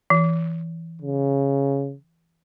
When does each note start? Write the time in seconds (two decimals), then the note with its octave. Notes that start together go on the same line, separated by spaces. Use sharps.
0.10 E3
1.02 C#3